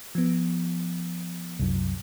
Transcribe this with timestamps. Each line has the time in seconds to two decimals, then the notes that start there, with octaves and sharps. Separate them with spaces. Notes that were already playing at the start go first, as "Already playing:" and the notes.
0.15 F3 B3
1.59 C2 F#2